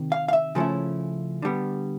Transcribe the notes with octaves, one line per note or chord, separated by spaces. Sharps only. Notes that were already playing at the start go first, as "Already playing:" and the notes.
Already playing: C3 D#3
F5
F5
E5
C#3 F3 A3 C#4 E4
D3 G3 B3